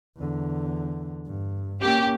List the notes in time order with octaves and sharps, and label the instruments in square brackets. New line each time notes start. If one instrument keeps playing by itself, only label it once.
[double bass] E2 D3
G2
[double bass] A#3 C#4 [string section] G4